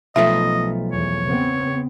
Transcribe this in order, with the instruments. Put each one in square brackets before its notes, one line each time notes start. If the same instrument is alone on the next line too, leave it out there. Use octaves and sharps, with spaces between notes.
[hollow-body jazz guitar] B1 F3 A3 [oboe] D#5 [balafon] E5
[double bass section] E2 [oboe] C#5
[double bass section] C#3 B3 C4